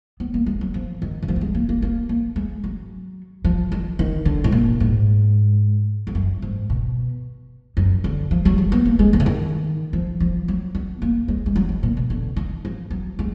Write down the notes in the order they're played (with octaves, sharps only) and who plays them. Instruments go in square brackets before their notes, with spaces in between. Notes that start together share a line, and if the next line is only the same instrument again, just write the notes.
[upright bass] B3
A#3
G#3
F#3
F3
D#3
D#3
F3
A#3
G#3
A#3
A#3
A#3
A#3
G#3
F#3
F3
D#3
D#3
D3
G#2
A#2
G#2
F2
F#2
G#2
B2
F#2
D3
F3
F#3
G#3
B3
A#3
G#3
F3
D3
D#3
F3
F3
F#3
B3
A#3
G#3
G#3
F#3
D#3
A#2
B2
D3
D#3
F3
F#3
G#3